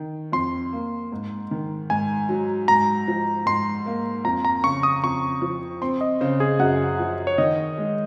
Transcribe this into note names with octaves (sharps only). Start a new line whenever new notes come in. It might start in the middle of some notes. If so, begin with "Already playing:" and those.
Already playing: D#3
F2 C6
A#3
G#2
D#3
G#2 G#5
F#3
G#2 A#5
F3
G#2 C6
A#3
F2 A#5
A#5
C#3 C#6
D#6
F2 C#6
F3
C4 C6
D#5
C#3 C5
G#4
F#2 F#5
F3
C#5
D#3 D#5
G#3